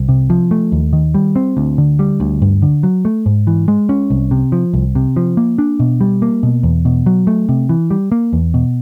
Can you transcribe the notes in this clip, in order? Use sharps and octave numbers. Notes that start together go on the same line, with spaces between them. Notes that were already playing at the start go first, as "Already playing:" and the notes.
Already playing: C2
C3
F3
A3
D#2
D#3
G3
C4
D2
D3
G3
D2
G2
D3
F#3
A3
G#2
E3
G#3
C#4
C2
C3
F3
C2
C3
F3
A#3
D4
B2
G3
A#3
B2
E2
B2
F#3
A3
C3
E3
G3
A#3
E2
B2